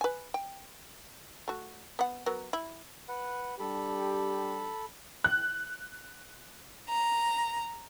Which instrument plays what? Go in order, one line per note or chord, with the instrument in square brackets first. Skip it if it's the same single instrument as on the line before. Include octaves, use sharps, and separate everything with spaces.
[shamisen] B4 G#5
G5
A3 F#4
B3 F#5
F#3 B3 A#4
E4
[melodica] B4 F#5
[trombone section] G3 D4 G4 [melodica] A4 B5
[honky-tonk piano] F#6
[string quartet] A#5